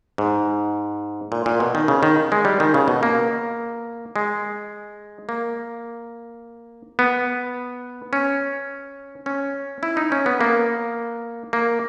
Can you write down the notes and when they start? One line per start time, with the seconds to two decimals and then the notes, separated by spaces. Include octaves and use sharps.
0.18 G#2
1.32 A#2
1.46 A#2
1.60 B2
1.75 D#3
1.88 C#3
2.03 D#3
2.32 G#3
2.45 G3
2.60 D#3
2.74 C#3
2.88 B2
3.03 A#3
4.16 G#3
5.29 A#3
6.99 B3
8.13 C#4
9.26 C#4
9.83 E4
9.97 D#4
10.12 C#4
10.26 B3
10.41 A#3
11.53 A#3